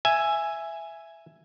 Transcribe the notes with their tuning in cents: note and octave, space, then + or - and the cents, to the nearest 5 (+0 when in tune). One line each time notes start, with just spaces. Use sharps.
E5 +10 G#5 +0